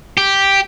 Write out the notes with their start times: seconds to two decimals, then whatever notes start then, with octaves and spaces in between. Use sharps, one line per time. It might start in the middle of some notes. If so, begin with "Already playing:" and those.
0.18 G4